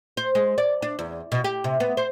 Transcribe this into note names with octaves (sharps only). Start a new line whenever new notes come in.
C5
G#3
D5
D4
E2
B2
G4
C3
B3
C5